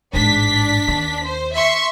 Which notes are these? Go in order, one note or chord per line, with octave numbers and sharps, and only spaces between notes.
A1 G#2 D4 B6
D#2
C5
E5 C6 C#6